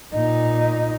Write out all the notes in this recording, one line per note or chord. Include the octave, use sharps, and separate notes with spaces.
A#2 D#4